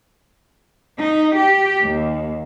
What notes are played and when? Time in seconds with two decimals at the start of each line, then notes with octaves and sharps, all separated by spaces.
0.98 D#4
1.35 G4
1.82 D#2